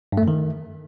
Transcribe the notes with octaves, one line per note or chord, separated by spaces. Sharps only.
G2
A3
F#2
D#3